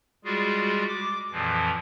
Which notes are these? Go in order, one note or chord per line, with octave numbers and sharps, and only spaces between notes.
G3 G#3 F4 F#4 G#4
D6
F2 A#2 E3 F3